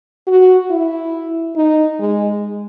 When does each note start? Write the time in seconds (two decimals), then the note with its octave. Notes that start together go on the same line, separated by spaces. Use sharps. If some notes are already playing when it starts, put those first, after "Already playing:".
0.27 F#4
0.71 E4
1.56 D#4
1.99 G#3